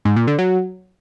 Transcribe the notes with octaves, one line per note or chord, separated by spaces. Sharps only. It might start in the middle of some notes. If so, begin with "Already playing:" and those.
G#2
A#2
D3
F#3